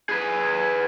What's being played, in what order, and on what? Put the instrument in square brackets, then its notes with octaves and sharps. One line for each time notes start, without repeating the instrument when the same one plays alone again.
[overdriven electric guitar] G#4 B4